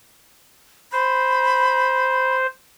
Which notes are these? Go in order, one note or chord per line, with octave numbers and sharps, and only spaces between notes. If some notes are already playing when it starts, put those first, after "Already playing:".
C5 B5